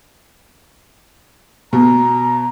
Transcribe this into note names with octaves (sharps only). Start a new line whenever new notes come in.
B2 A#5